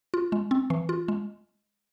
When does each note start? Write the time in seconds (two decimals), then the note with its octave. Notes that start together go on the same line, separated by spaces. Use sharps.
0.14 F4
0.32 G#3
0.51 C4
0.70 E3
0.89 F4
1.08 G#3